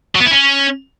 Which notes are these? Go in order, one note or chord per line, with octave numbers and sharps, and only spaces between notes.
F#3
B3
E4
C#4